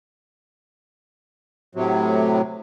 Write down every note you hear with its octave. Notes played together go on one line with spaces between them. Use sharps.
A2 C3 F#3